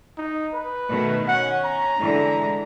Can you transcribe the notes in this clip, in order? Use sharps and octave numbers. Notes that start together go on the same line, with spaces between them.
D#4
B4
B2 D#3 A3
C#4 F#5
A#5
D3 E3 G#3